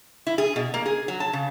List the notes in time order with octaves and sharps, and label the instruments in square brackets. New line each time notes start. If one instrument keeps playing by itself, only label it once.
[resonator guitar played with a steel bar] E4
G#4
B2
A#3
G#4
F#3
A5
C#3